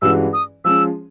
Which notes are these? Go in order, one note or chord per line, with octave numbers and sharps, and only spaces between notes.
G2 E3 G#3 C#4 F#4 E6
D#6
F3 G#3 C#4 E6